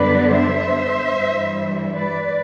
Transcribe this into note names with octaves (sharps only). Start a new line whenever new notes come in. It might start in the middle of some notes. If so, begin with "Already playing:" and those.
Already playing: F#2 D3 G3 B3 D4 B4 D5
C5 E5
G2 E3 G3
B4 D5